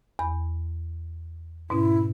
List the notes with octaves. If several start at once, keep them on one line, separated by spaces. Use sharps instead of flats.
E2 B5
G#2 B2 C#4 E4